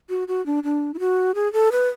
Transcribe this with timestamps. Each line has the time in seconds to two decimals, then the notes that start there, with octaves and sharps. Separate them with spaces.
0.10 F#4
0.28 F#4
0.46 D4
0.64 D4
0.94 E4
1.00 F#4
1.35 G#4
1.53 A4
1.72 B4